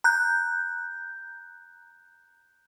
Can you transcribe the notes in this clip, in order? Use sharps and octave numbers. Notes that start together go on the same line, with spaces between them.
A#5 F#6 G6